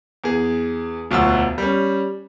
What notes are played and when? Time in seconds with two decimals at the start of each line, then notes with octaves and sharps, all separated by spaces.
0.24 E2 G#4
1.11 E1 D2 F#3 F4 F#4 E6
1.58 G3 C#4